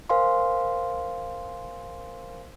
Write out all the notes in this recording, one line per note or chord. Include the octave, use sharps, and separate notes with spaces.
A#4 C5 F5 G#5 C6